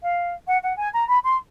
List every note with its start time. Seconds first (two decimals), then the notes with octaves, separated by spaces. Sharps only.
0.01 F5
0.47 F#5
0.62 F#5
0.77 G#5
0.93 A#5
1.08 B5
1.23 C6